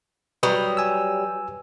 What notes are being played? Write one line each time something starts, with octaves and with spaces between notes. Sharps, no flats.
F#3 G3 B4 A#5 D#6
G#5 E6